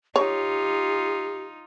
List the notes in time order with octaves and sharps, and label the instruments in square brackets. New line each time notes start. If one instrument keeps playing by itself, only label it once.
[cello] D#4 F4 [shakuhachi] G4 [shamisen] C#5